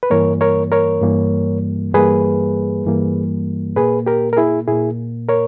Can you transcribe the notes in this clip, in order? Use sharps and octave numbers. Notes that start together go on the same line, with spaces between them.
B4
G2 E3 G3 A#3 A#4 C#5
A#4 C#5
A#4 C#5
G2 E3 G3 A#3
G2 E3 G3 A#3 G#4 B4
G2 E3 G3 A#3
A#2 A#3 G#4 B4
G4 A#4
A#4
E4 G#4
A#2 A#3 E4 G#4
A#4 C#5